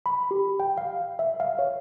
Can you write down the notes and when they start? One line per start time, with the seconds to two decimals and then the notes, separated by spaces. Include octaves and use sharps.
0.06 B5
0.31 G4
0.60 G5
0.78 F5
1.19 E5
1.40 F5
1.59 C#5